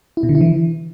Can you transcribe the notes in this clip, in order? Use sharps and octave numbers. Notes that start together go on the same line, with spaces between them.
E4
B2
D3
E4
E3